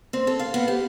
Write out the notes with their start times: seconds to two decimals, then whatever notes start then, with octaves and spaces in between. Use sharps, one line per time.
0.13 C4
0.27 A4
0.39 F5
0.54 B3
0.68 G4